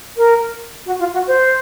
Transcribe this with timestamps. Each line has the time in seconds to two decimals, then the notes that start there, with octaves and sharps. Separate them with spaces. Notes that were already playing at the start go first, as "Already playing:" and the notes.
0.17 A#4
0.86 F#4
0.99 F4
1.13 F#4
1.27 C5